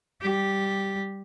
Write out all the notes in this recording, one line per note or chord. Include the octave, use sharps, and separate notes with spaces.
G3 G4